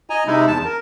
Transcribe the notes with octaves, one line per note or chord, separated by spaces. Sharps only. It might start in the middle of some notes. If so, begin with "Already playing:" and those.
D#5 G#5 A#5
C3 G#3 D#4 E4
E2 A5
A#4